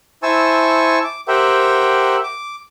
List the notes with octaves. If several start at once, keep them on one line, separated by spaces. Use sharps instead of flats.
E4 C5 G#5 A5 C#6 E6
D6
G4 A#4 C5 E5 F#5 G5
D6